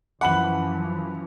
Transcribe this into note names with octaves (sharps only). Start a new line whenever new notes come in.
F#2 E3 F3 F#5 B5 F#7